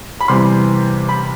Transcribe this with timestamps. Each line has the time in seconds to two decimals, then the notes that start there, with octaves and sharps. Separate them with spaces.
0.21 B5
0.28 E2 C3 E3 G3 C6
1.09 B5